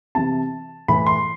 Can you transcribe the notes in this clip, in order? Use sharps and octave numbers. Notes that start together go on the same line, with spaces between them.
C3 E3 A5
A2 E3 B5
C6